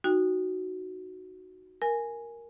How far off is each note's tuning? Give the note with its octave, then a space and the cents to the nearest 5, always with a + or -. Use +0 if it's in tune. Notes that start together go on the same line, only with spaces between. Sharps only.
D#4 -5 F#4 +0 G5 +30
A#4 +0 G#5 +0